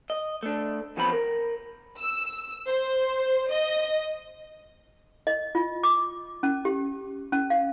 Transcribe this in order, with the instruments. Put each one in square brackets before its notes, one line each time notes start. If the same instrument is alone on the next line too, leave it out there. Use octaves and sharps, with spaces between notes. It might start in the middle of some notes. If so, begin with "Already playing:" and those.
[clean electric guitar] D#5
A3 D4
E2 F3 B3 C4 B5
A#4
[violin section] E6
C5
D#5
[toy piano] D#5
F4
D6
C#4
G4
C#4
F5